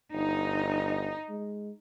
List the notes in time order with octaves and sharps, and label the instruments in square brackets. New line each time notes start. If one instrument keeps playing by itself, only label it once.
[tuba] G1 [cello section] D#4
[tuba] G#3